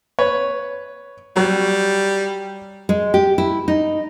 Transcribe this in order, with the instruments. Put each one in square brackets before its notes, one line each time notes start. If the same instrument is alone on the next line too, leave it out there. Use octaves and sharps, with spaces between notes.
[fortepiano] B4 C#5
[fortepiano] F#3 [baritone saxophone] G3
[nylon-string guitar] G#3
G4
E4
D#4